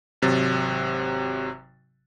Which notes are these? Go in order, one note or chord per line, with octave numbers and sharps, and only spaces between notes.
G#1 C3 F#3 A6